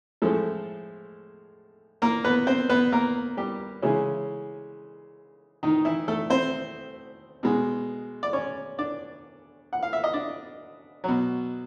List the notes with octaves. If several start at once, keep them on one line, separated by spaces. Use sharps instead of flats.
A2 F3 G#3 A3 A4
A#3 A#4
B3 B4
C4 C5
B3 B4
A#3 A#4
G3 G4
C#3 E3 G#3 C#4
D#3 D#4
E3 E4
A3 A4
C4 C5
B2 G#3
D5
C#4 C#5
D4 D5
F#5
F5
E5
D#5
D4 D5
B2 F#3